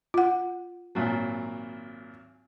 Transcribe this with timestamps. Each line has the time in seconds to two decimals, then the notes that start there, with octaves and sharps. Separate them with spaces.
0.14 F4 F#5
0.95 G#1 A#2 F#3